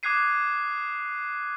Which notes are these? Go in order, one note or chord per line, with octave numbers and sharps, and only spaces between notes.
D6 D#6 F#6 G#6 C7 D#7